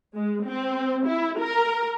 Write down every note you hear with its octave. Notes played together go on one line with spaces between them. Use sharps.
G#3
C4
E4
A#4